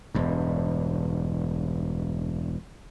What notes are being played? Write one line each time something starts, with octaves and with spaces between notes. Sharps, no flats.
E1 G2